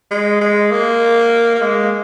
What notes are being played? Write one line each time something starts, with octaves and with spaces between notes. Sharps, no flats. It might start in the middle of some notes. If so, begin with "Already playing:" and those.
G#3
G#3
A#3
A#3
G#3